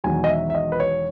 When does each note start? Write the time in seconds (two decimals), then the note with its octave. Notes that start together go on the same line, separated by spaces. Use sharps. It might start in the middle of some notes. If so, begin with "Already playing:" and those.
0.04 E1 E2 D#3 F#3 G#5
0.24 D#5
0.29 E5
0.50 E5
0.55 D#5
0.72 B4
0.80 C#5